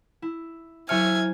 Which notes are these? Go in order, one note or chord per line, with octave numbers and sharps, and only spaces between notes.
E4
F#3 E4 C5 E5 G#5 F6 C#7